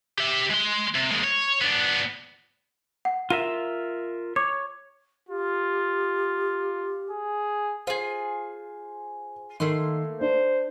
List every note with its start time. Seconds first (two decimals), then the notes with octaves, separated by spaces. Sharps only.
0.18 G4 E5
0.50 G#3 C6
0.95 C3
1.11 D#2 G#3
1.24 C#5
1.61 B3 D4
3.05 F#5
3.30 F4 A#4 E5 D#7
4.36 C#5 D6
5.29 F4 G4
7.11 G#4
7.87 F4 G#4 C5
9.60 D#3 A3 A#3 C6
10.21 D4 C5